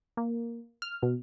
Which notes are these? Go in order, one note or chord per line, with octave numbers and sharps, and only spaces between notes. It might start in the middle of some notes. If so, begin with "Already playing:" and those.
A#3
F6
B2